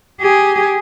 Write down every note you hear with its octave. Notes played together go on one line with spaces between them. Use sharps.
G4 G#4